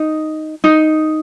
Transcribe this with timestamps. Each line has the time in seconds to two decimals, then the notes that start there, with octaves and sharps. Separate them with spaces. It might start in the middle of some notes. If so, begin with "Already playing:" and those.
Already playing: D#4
0.64 D#4